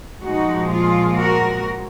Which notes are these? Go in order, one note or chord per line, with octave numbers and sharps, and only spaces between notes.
A#2 F3 G#3 D#4 F#4
F4 G#4
F#4 A#4